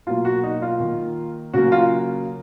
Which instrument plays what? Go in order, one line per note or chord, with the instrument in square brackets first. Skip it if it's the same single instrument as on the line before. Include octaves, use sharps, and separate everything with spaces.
[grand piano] B2 F#3 A#3 F4
F#4
D#4
F4
D#3 A#3
C#3 F#3 A#3 F#4
F4